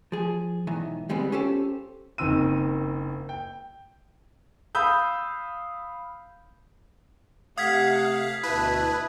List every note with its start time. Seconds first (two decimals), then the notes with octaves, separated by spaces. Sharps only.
0.12 F3 G#4
0.67 B1 G#2 D#3 E3
1.09 D3 G3 G#3 B3 C4
1.32 C#4 F4 G4 A4 C5
2.18 F#1 D#3 C4 E6 D#7
3.29 G5
4.75 F5 B5 D#6 E6 G6
7.58 C3 A3 F5 F#5 D#6 G#6 B6
8.43 D2 B2 E4 B4 A5